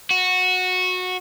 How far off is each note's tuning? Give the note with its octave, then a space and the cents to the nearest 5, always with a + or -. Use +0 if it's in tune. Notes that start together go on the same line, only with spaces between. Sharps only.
F#4 -15